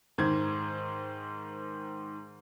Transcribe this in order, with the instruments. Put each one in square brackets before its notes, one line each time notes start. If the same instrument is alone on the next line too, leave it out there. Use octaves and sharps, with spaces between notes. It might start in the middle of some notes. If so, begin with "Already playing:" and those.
[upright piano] G#2 D#3 C5 G#6